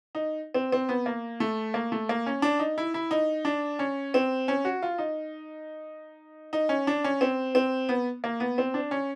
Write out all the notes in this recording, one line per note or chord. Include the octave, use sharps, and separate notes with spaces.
D#4
C4
C4
B3
A#3
A3
A#3
A3
A#3
C#4
D4
D#4
E4
E4
D#4
D4
C#4
C4
C#4
F#4
F4
D#4
D#4
C#4
D4
C#4
C4
C4
B3
A#3
B3
C4
D4
C#4